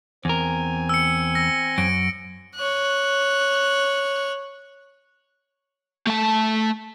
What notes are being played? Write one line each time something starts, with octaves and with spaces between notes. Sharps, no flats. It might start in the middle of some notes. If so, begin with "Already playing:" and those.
E2 C4 A#4 G#5
E6 C#7
E6 A#6
F#2 D7
C#5 F#6
A3 A5